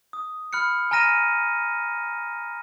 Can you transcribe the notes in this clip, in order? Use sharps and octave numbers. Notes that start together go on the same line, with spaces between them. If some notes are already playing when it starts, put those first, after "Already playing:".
D#6
B5 F6 F#6 C#7
G#5 A#5 F6 A#6 D#7